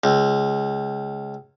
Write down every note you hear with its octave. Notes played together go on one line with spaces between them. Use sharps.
C#2